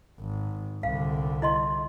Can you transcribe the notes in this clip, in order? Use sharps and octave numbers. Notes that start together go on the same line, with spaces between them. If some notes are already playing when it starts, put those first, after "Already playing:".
G#1
C2 D3 F5
E4 D#5 C6